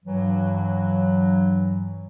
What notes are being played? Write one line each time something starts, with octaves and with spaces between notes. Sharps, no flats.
G2 E3 F#3